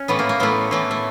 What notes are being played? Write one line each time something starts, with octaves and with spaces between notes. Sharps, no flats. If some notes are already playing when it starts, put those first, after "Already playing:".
Already playing: C#4
A2 E3 A3 B3
A#3
A#3
A2 E3 A3 B3
A2 E3 A3
A3